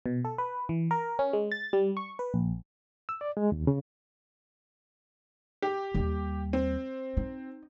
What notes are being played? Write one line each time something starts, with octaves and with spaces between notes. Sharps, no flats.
B2
A4
B4
E3
A#4
C#4
G#3
A6
G3
C#6
B4
A#1
E6
D5
G#3
D#2
C#3
G4
D#2 G3
C4
D#4